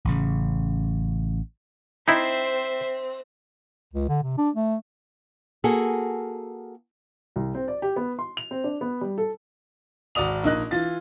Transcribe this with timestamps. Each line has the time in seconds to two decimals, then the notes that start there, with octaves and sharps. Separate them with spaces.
0.05 A1 C#3
2.08 C4 D#4 E4 C5 E5
3.94 C#2
4.09 D3
4.23 C3
4.38 D4
4.55 A3
5.64 A#3 F#4 G#4 A4
7.36 C2
7.55 C4
7.68 D5
7.82 G4
7.96 B3
8.19 C6
8.37 F7
8.51 C4
8.64 D4
8.81 B3
9.01 G3
9.18 A4
10.15 G#1 F#4 D5 D#6 F7
10.44 A#1 A#3 D#4 D#5 F#6
10.71 E3 F4 A6